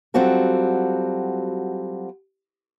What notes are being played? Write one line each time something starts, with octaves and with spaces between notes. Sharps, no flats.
F#3 G3 C4 F4 F#4 A4